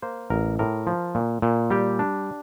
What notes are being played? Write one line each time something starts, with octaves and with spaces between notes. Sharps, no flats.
A#3 C5
A1 A#4
A2 A#4
F3
A#2
A#2
G3 G4
D4